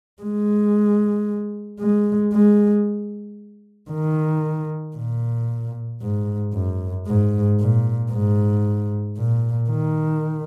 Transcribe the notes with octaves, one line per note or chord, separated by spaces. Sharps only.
G#3
G#3
G#3
D#3
A#2
G#2
F#2
G#2
A#2
G#2
A#2
D#3